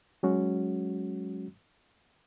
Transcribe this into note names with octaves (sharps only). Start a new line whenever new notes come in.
F#3 G#3 C#4 F#4